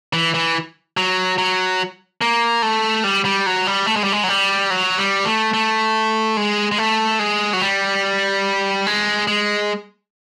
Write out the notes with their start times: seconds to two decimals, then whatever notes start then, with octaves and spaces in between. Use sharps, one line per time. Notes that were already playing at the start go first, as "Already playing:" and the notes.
0.13 E3
0.34 E3
0.97 F#3
1.38 F#3
2.21 A#3
2.62 A3
3.04 G3
3.25 G3
3.46 F#3
3.67 G3
3.87 A3
3.96 G#3
4.04 G3
4.12 G#3
4.23 F#3
4.29 G3
4.70 F#3
4.98 G3
5.26 A3
5.54 A3
6.37 G#3
6.72 G#3
6.78 A3
7.19 G#3
7.53 F#3
7.62 G3
8.87 G#3
9.28 G#3